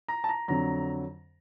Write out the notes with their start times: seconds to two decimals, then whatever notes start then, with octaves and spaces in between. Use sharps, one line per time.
0.08 A#5
0.24 A5
0.29 A#5
0.48 F2 D3 F#3 A#5